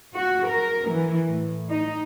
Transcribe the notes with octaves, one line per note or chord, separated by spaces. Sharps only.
F#4
A#4
E3
A2
D#4